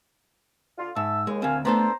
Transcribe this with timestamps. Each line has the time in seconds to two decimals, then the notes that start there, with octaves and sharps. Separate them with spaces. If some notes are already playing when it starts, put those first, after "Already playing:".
0.78 D3 F4
0.96 G#2 E5 A5 E6
1.27 D#2 G#3
1.42 D2 C4 A#4 F5 G#5
1.65 A3 B3 D4 A4 C5 A#5